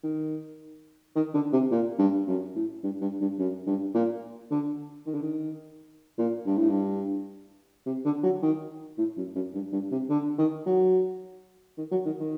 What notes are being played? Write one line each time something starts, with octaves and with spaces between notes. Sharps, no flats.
D#3
D#3
D3
C3
A#2
G2
F#2
A2
G2
G2
G2
F#2
G2
A#2
D3
D#3
D3
D#3
A#2
G2
A2
G2
C3
D3
F#3
D#3
A2
F#2
F#2
G2
G2
C3
D3
D#3
F#3
D#3
F#3
D#3
D#3